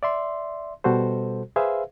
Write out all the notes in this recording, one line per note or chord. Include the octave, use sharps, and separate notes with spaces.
D5 E5 C6
B2 G3 F#4 A4 C5
G#4 B4 C5 E5 F5